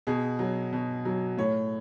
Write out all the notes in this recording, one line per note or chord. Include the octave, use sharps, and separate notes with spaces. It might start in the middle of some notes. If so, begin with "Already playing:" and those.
B2 G#4
F#3
B2
F#3
A2 C#5